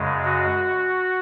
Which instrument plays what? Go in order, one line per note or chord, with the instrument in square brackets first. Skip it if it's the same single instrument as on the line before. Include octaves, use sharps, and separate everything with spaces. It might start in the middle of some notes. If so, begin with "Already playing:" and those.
Already playing: [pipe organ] F#2 C#3 G#3
F#4